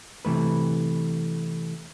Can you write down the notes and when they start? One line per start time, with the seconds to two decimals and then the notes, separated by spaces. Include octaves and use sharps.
0.25 C3 E3 A3 B4